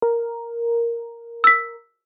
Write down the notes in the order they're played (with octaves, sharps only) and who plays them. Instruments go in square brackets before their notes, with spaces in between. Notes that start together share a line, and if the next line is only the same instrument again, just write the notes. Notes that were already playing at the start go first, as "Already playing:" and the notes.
[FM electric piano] A#4
[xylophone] E6 B6